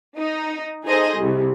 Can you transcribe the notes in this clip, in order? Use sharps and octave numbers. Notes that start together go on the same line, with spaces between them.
D#4
D#4 G#4 A4 C5 D#5
C2 C3